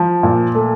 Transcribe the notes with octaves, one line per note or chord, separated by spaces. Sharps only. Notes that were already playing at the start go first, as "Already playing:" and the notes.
Already playing: F3
A#2
A3